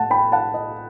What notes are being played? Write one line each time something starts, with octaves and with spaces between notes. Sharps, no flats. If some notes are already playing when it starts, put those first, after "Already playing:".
Already playing: A2 F#5 A5
G5 B5
F#5 A5
D#5